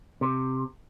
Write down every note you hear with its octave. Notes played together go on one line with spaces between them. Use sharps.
C3